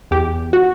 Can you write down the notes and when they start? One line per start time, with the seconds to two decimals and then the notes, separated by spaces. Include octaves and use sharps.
0.11 E2 G4
0.53 F#4